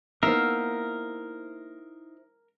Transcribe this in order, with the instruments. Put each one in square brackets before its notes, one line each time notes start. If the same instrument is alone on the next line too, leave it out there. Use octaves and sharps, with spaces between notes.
[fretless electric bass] A#3 B3 [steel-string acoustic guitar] D#4 E4 C5 [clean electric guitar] A#4 [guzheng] E5 F5